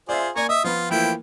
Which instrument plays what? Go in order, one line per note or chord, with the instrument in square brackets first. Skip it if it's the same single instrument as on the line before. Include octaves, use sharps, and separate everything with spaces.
[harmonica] F4 G#4 C5 [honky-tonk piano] D5 E5
[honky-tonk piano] A#3 D5 [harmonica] G#5 A#5 C#6
[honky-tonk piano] D#5 [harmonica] E5 D#6
[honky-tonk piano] F3 B3 B5 [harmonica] F4
[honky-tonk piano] E3 A3 A#3 [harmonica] F3 E4 G5